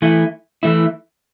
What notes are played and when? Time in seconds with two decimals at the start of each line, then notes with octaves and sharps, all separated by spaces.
0.02 E3 A3 E4
0.63 E3 A3 E4